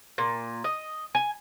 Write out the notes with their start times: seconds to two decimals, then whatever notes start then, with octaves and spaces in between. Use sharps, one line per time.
0.18 A#2
0.64 D#5
1.15 G#5